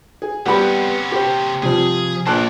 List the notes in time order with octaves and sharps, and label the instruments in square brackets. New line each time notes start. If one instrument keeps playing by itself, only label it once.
[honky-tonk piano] G#4
[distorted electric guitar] C3 C#4 [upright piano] G3 B3 G4 [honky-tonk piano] F#5 B5
[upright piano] G4 C5
[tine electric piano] C3 F3 [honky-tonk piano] G3 [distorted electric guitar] G#4
[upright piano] A#1 [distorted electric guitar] C5 D5 [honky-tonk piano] A5 F#6